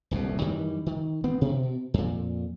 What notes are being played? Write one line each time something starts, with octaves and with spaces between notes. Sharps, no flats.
D#1 C2 F2 B2
F#2 D#3 E3 G3
D#3
A1 B3 C4
B2
F2 A#2